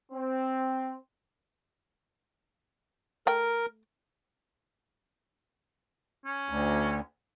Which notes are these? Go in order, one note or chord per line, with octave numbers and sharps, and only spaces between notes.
C4
A3 A#4 G5
C#4
D2